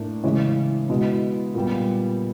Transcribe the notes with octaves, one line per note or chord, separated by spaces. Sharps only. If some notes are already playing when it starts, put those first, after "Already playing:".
Already playing: A2 A#3 D4
C#3 E3 G#3 C#4
B2 G#3 B3 E4
A#2 G3 B3